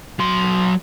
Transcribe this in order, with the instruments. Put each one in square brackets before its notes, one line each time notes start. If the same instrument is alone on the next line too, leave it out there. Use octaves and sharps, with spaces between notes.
[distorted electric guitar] F#3 C6